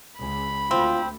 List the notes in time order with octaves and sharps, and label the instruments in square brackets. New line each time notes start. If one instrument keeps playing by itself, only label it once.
[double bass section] C#2 [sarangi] B5
[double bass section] D2 [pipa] C4 [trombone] F4